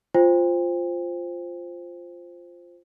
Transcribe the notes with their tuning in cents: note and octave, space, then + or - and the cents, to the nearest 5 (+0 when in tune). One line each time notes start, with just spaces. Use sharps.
F4 +0 C5 +0 G5 +40